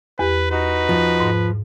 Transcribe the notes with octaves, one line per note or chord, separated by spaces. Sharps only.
E2 G4 B4
D#4 F#4 B4
F3
G#2